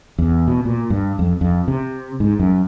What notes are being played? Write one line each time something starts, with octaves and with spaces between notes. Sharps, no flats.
E2
B2
A#2
G2
F2
F2
C3
G#2
F#2